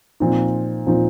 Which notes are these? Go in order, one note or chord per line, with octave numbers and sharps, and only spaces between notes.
A#2 F3 C4 D#4
A#2 F3 C4 D#4